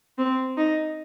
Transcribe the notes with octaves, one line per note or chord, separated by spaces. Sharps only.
C4
D#4